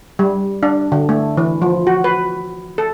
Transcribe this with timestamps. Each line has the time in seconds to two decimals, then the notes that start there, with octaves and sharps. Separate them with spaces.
0.19 G3
0.63 D4
0.92 D3
1.09 A3
1.37 E3
1.62 F3
1.87 F#4
2.04 B4
2.78 A4